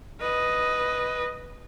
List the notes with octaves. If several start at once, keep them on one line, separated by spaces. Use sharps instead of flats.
B4 D#5